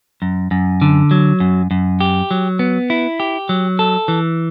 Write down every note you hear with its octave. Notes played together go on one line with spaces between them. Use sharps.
F#2
F#2
D3
F#3
F#2
F#2
G4
F#3
B3
E4
G4
F#3
A4
E3